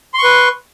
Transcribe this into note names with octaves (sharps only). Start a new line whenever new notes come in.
B4 C6 C#6